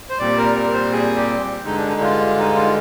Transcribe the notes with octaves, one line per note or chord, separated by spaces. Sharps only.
C5
A#2 G3 C4 D5
A#4
A#4
C5
G#4
G4
G2 D3 G#3 D#4
D4
D#4
F4
D#4
F4